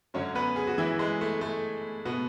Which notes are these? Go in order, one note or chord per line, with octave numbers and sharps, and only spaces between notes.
F#2 D3 F#3 C#4 C#5
B3 B4
G#4
F#4
E3 E4
G#3
A3
A3
B2 B3